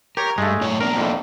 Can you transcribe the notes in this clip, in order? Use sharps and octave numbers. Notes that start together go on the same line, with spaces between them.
G4 A#4 C#5
G2 G#3 A3
F#2 A2 C#5
A#3 B3 D4 A#4
F2 A2